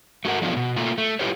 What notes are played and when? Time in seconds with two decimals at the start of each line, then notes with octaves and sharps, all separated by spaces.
0.25 A3 F#4 A4 A#4 F#5
0.42 F3 F#3 A3 B3 D4 F4
0.57 B2
0.77 A3 A#3 F4
0.98 A3
1.19 E4 F4 G4 B4 C#5